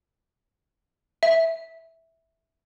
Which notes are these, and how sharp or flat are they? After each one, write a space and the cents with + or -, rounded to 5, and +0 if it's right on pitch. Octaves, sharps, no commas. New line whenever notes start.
E5 -10